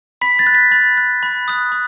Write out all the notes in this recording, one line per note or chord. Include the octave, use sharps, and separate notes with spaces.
B5 B6
A6
F#6
B6
B5 A6
F#6
B5
D#6 F#6
B5